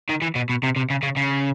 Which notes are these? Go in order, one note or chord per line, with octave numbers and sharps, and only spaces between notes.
D#3
E3
B2
B2
C3
C3
C#3
C#3
C#3